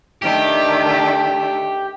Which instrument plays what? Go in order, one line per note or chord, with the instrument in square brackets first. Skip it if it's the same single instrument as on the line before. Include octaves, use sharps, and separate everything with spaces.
[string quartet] D#3 A3 D4 [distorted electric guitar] G4